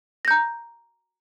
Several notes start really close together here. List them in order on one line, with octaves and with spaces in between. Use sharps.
A#6 G6 A#5